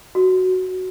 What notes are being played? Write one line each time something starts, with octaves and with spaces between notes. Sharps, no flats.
F#4